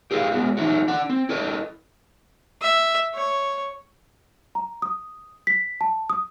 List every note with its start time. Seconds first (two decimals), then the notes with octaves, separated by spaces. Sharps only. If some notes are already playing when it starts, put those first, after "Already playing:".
0.11 G4 G#4 B4 E5 F5
0.32 G#3 B3 F#4
0.57 E3 F#3 D#4 E4 F#4
0.88 D4 F#5
1.10 C4
1.29 E4 A4 B4 D#5
2.62 E5
3.14 C#5
4.55 A#5
4.82 D#6
5.47 B6
5.81 A5
6.10 D#6